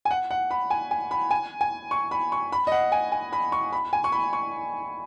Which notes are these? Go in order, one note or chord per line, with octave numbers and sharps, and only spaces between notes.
G#5
F#5
F#5
B5
G#5
G#5
B5
G#5
G#5
C#6
B5
C#6
B5
D#5
F#5
G#5
G#5
B5
C#6
B5
G#5
C#6
B5
C#6